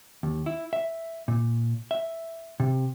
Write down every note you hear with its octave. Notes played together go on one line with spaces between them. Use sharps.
D#2
E4
E5
A#2
E5
C3